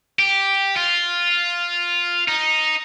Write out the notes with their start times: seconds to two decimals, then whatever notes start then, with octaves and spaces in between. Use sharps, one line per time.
0.19 G4
0.77 F4
2.28 D#4